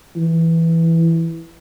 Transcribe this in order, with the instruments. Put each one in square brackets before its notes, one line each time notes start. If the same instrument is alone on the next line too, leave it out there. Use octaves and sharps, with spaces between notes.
[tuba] E3